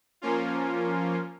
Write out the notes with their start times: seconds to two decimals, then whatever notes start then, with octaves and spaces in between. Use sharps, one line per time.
0.22 F3 A#3 C#4 F4